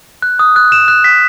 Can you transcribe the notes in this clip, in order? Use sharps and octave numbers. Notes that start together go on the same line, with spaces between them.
F#6
D#6
F#6
E7
F#6
B6